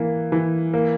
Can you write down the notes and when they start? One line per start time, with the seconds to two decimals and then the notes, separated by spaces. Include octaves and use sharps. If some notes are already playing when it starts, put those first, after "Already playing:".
Already playing: E3 A#3
0.32 E3
0.74 A#3